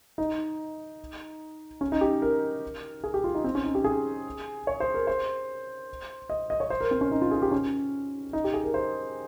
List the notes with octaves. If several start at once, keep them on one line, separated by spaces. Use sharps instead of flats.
D#4
C#4
D#4
G4
A#4
G#4
G4
F4
D#4
C4
C#4
D#4
G4
G#4
C#5
C5
A#4
C5
D#5
D#5
C#5
C5
A#4
C4
C#4
D#4
F4
G#4
G4
C#4
D#4
G4
G#4
A#4
C5